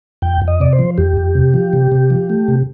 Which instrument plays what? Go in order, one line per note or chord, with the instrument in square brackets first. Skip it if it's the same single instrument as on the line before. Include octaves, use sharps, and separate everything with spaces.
[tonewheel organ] F2 G5
F2
D#5
C3 D5
C5
F3
F2 G4
F2
C3
F3
C3
C3
F3
A3
C3